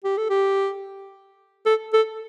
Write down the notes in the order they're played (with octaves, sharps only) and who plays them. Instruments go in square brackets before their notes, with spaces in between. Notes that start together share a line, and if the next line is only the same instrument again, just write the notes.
[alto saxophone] G4
A4
G4
A4
A4